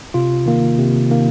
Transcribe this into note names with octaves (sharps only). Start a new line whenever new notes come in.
C3 F4
D#3 A#3
C3
D#3 A#3